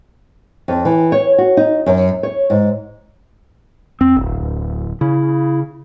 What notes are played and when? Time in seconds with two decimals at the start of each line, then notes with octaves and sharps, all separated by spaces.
0.68 F2
0.85 E3
1.12 C#5
1.38 F#4
1.57 D#4
1.86 F#2
2.23 C#5
2.50 G#2
4.01 E2 C4
4.17 D1 G1
4.42 D2
5.01 C#3 E4